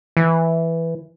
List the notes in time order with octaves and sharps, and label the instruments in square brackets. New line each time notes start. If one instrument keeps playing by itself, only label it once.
[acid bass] E3